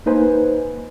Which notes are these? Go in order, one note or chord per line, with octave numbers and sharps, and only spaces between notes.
A#3 D#4 B4 C5 G#5